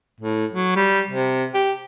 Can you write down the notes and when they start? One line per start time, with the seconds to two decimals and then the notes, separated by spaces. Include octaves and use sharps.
0.20 A2
0.53 F#3
0.76 G3
1.10 C3
1.54 G4